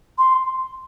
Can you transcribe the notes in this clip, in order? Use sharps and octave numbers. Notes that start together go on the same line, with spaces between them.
C6